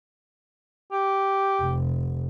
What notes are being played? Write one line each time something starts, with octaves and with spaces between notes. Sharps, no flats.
G4
F1